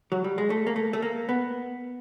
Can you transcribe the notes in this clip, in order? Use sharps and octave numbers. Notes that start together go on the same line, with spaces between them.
F#3
G3
G#3
A3
A#3
A3
A3
A#3
B3